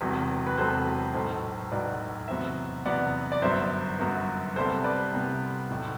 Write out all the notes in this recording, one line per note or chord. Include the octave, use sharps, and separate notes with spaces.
E1 E2 C3 F#3
B4
E1 E2 C3 F#3 A4 C5
B1 A2 F#3 A4 C5
B1 A2 F#3 B4 D5
E2 C3 F#3 B3 C5 E5
E2 C3 F#3 B3 D5 F#5
D5
G1 F#2 F#3 B3 C5 E5
G1 F#2 F#3 B3
C2 C3 G3 B3 A4 C5
B4 D5
C2 C3 G3 B3
B1 A2 F#3